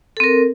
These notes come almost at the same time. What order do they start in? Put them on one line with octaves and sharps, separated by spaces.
A4 C4 A#4